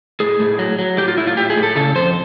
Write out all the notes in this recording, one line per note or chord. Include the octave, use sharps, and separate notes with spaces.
A2 G#4
A2
F#3
F#3
A2 G4
F4
A2 E4
F4
A2 G4
G#4
A2
A4
C#3 A4
F2 C5